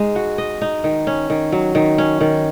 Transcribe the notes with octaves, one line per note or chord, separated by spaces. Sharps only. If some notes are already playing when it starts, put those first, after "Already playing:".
Already playing: G#3 D#4
F#4
D#5
D#4
D#3
C#4
D#3
F#3
D#3
C#4
D#3